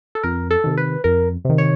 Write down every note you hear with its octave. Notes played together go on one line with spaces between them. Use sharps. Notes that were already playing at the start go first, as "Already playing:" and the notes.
A4
F2 A#4
A4
C3 D#3
B4
F2 A#4
C3 D#3
C#5